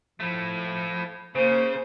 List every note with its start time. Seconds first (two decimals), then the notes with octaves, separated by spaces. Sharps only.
0.20 F3 A3 E4
1.35 C#3 A#3 C5